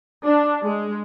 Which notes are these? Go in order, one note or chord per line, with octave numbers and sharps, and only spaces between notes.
D4
G#3